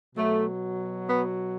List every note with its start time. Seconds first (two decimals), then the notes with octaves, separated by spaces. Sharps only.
0.14 B2 F#3 A3
1.06 B3